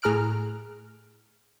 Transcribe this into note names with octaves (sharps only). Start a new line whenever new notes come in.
A2 G#4 A#5 F6 F#6 D7